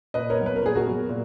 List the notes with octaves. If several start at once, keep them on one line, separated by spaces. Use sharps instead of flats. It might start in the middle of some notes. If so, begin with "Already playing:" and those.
A#2 B4 D#5
A#4 C#5
F#3 B3
B4
A#4
A#2 G#4
F#4 A#4
F#3 B3
A#2